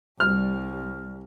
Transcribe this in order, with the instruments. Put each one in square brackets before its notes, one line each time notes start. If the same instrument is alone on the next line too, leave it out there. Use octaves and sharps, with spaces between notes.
[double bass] C2 [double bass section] G3 [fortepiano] F6